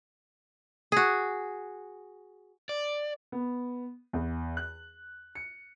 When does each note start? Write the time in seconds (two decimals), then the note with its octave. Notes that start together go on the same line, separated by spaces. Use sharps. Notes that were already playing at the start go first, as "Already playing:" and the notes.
0.92 F#4 G#4
2.69 D5
3.32 B3
4.13 E2
4.57 F#6
5.35 C#7